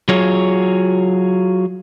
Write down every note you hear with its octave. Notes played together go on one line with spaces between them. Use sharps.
F#3 F4 G#4 C#5